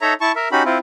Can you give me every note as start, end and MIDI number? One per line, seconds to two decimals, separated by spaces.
0.01 0.14 63
0.01 0.14 69
0.01 0.14 73
0.01 0.14 76
0.01 0.14 82
0.21 0.32 64
0.21 0.32 81
0.21 0.32 85
0.36 0.48 70
0.36 0.48 76
0.52 0.63 61
0.52 0.63 63
0.52 0.63 66
0.52 0.63 67
0.52 0.63 83
0.65 0.78 60
0.65 0.78 64
0.65 0.78 65